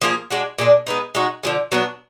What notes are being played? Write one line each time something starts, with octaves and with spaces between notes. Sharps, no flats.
F3 A#3 F4 G#4
G#3 D4 F#4
A#2 G#3 D4
G#3 B3 D#4
G#3 D#4 F#4
D3 F3 G#3
F#3 B3 D4